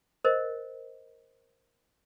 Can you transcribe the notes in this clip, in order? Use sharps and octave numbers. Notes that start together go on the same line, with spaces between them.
A#4 C5 D#5